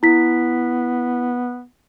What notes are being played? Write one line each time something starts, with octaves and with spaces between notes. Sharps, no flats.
B3 E4 B6